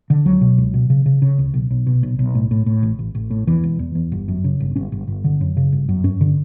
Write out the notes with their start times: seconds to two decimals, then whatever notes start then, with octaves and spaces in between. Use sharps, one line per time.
0.10 D3
0.25 C#2 F#3
0.41 B2
0.58 C#2
0.74 B2
0.90 C#3
1.06 C#3
1.22 C#3
1.39 C#2
1.54 B1
1.70 B1
1.86 B2
2.03 B1
2.19 B1
2.35 A2
2.51 A2
2.66 A2
2.82 A1
2.99 A1
3.15 A1
3.30 A2
3.47 E2 E3
3.63 E1
3.79 E2
3.95 E2
4.12 G1
4.28 F#2
4.44 C#3
4.60 G1
4.76 G1 C#4
4.92 G1
5.07 G1
5.24 D3
5.41 F#2
5.57 C#3
5.72 G1
5.89 F#2
6.04 G2 C#4
6.21 D3